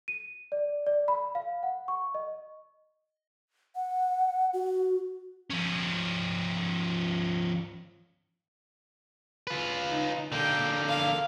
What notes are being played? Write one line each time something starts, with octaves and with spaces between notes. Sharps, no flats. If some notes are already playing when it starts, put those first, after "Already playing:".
D#7
D5
D5
B5
F5
F#5
C#6
D#5
F#5
F#4
F3 C#4
F4 B4
D#4
D3 A#3 G5
F5